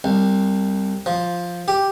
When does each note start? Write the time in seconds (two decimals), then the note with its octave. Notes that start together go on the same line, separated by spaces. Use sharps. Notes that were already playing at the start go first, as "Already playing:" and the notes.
0.04 C2
1.06 F3
1.68 G4